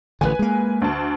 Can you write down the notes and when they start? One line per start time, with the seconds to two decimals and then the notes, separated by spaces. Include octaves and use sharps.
0.21 A1 D3 B4 G#5
0.39 G#3 A#3
0.82 D2 A5